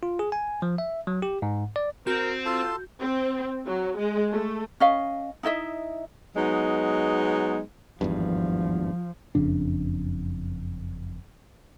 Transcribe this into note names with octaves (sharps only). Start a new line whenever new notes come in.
F4
G#4
G#5
F3
E5
F#3
G4
G#2
D5
C4 F#4 A#4 G6
F4 A4 A5 C6
C4
F#3
G#3
A3
C#4 D#5 F5
D#4 E4 D#5 E5
F#3 G#3 B3 D#4
G#1 E2 G2 F3
F#1 F2 C#3 D4